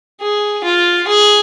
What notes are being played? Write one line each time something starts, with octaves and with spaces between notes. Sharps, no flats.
G#4
F4
G#4